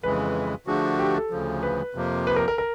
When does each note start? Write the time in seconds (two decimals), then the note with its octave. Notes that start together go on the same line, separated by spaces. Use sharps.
0.03 F2 C#3 E3 G#3 B4
0.67 D3 F3 A3 D4 F#4 G#4
0.99 G4
1.15 A4
1.30 D2 C#3 F3
1.63 B4
1.95 F2 C3 F3 A#3
2.27 B4
2.36 A#4
2.48 A#4
2.58 A#4